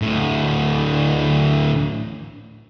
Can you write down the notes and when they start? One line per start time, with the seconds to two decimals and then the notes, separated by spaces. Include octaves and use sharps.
0.02 D2 A2